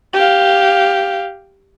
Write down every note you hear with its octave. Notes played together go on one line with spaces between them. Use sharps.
G4 F5